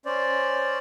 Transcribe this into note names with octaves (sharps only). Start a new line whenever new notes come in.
C#4 C5 D5